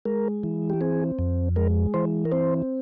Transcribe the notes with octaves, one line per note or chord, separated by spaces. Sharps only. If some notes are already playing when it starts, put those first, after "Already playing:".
G#3 A#4
E3
G4
C4 G#4
F2
G#3 A#4
E3 C5
A#4
C4 C5